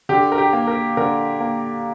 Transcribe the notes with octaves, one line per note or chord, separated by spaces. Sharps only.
D3 G4
A#4
G4
A#3
A#4
D3 A#4
A#3